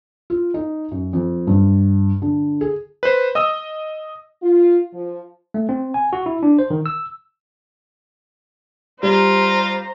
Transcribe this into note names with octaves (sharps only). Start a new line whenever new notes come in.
F4
D#4
F#2
F2
G2
D3
G#4
B4 C5
D#5 D#6 E6
F4
F3
A3
C4
G#5
F#4
E4
D4
C5
D#3
E6
G3 F4 C5 A#5